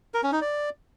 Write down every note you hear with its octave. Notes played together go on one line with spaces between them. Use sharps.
A#4
C#4
D#4
D5